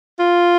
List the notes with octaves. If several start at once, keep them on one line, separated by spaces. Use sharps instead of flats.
F4